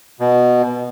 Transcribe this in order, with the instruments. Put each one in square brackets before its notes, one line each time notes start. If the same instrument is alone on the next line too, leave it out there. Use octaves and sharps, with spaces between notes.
[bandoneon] B2